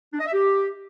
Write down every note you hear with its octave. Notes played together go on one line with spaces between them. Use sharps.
D4
D#5
E5
G4